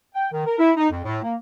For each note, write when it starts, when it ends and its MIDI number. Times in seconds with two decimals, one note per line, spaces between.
0.15 0.31 79
0.33 0.44 51
0.45 0.56 70
0.59 0.71 64
0.77 0.87 63
0.90 0.99 41
1.04 1.19 45
1.23 1.34 58